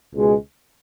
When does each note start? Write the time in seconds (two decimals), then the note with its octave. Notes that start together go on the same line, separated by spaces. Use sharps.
0.14 C#2 B2 G#3